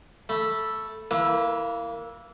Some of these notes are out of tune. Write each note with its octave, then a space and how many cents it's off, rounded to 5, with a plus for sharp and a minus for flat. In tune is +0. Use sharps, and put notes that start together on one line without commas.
A3 +0 B5 -15
A#3 -15 E4 +0 B4 -40